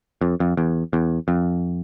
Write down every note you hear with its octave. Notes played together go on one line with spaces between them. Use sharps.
F2
F2
E2
E2
F2